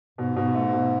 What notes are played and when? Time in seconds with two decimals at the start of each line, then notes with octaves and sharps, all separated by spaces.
0.18 G#2 B2
0.36 G#2 B2
0.55 A3
0.73 B2